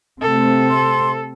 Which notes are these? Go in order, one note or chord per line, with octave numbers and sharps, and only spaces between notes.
C3 A3 C4 A4
C6